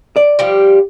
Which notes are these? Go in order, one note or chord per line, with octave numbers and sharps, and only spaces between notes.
D5
F3 G3 G4